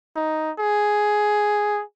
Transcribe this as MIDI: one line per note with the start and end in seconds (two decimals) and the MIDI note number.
0.16 0.51 63
0.59 1.83 68